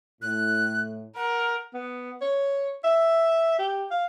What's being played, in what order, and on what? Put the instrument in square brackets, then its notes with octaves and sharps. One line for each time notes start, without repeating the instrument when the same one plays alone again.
[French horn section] A2 [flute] F#6
[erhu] A#4 [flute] F#5
[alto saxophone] B3
C#5
E5
G4
F5